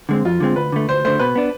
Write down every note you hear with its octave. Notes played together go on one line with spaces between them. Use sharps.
D3 G#3 C4
F2 F4
D3 G#3 C4
D2 B4
D3 A3
D2 C5
D3 A3 C5
B2 B4
B3 D4